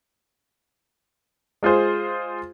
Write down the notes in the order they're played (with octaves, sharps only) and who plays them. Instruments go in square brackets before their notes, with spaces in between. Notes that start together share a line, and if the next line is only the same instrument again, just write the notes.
[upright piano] G#3 F4 G#4 C5